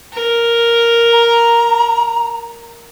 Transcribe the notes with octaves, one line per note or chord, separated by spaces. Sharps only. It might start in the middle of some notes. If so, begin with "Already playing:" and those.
A#4
A#5